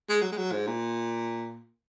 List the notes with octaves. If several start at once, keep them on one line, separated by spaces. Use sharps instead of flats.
G#3
F#3
G#3
F#3
G#2
A#2